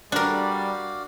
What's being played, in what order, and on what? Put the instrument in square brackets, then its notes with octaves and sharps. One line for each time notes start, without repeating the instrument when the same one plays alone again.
[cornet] G3 [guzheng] D4 A#4 [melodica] F#4 D5 F5